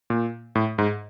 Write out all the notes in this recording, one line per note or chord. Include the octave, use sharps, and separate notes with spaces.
A#2
A2
G#2